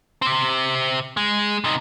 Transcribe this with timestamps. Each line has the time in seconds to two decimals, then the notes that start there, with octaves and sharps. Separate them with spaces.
0.22 C3 C4
1.17 G#3
1.64 C3 D#4